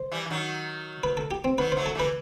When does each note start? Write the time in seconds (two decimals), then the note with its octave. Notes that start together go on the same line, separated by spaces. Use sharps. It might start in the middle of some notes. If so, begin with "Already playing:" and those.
Already playing: C5
0.12 E3 G3
0.26 E3
0.30 D#3 F#3
1.03 B4
1.17 A4
1.31 G4
1.44 C4
1.58 D#3 F#3 B4
1.72 F#3 A3 C5
1.86 A4
1.95 E3 G3 B4